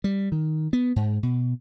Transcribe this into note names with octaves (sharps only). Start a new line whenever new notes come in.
G3
D#3
B3
G#2
B2